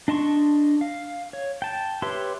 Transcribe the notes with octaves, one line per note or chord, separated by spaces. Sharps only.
D4 D#5 A5 C6 C#6
F5
C#5
G5 A5
G4 B4 C#5 E5 C6